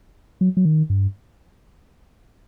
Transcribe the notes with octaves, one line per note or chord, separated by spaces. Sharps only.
F#3
F#3
D#3
G2